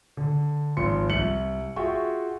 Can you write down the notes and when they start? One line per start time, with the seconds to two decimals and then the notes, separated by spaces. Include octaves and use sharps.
0.17 D3
0.77 G#1 F3 C6 C#7
1.10 C2 C#7 F#7
1.76 F4 F#4 G#4 E5 G5 C#6